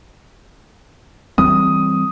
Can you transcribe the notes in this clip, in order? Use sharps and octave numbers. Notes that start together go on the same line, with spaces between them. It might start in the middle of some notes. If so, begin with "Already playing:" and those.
E3 G3 C4 D#6